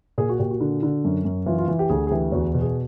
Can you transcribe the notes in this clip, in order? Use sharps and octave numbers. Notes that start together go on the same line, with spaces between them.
A#2 G#4
F#4
A#2 G4
F#4
D3
D3
F#2
F#2
E3 F4
F4
E3
G4
D2 G#4
G#4
E3 G4
E2 F#4
B2
G#4